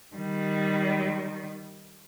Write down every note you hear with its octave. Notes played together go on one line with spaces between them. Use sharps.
D#3 G3